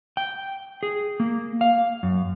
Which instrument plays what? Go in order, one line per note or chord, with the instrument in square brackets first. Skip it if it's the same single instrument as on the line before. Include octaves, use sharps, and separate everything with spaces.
[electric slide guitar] G5
G#4
A#3
F5
F#2